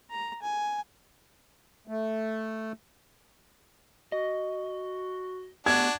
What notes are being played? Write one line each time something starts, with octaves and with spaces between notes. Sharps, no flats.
A#5
G#5
A3
F#4 D#5
A3 B3 D4 F#4 G4 G#6